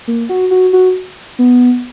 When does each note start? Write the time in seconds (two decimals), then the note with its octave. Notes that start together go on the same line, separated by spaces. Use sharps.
0.08 A#3
0.29 F#4
0.51 F#4
0.73 F#4
1.39 B3